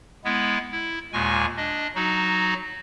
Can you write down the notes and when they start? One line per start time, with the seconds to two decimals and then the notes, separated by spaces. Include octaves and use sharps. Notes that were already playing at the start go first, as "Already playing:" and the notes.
0.25 G#3 B3 E4
0.71 E4
1.13 D#2 A#2 G#3 G#5 C#6
1.57 D4 D#5
1.95 F#3 D#4 F#4